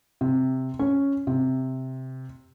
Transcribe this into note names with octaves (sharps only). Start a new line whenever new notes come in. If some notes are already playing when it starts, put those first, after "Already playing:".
C3
C#4
C3